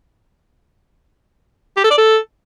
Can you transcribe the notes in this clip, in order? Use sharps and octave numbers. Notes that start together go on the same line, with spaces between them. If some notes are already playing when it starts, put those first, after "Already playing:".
G4
A4
D5
A4